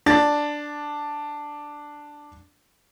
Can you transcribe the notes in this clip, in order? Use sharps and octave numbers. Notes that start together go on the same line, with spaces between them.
D4 A6